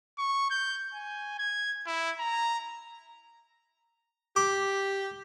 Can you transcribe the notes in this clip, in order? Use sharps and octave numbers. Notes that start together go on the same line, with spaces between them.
C#6
G6
G#5
G#6
E4
A#5
G4 D6